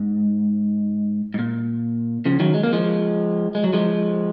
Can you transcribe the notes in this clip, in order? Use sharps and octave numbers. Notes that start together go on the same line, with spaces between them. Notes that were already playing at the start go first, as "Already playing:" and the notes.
Already playing: G#2
G#2
A#2
C#3 F3
D#3 F#3
G#3
A#3
F3 G#3
G#3
F#3
F3 G#3